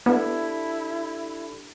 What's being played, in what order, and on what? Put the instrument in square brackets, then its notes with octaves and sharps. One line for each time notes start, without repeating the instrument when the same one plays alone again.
[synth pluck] B3 [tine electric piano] D4 G4 A4 [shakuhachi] E4